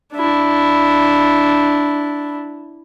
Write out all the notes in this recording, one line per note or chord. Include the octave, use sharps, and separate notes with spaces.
D4 E4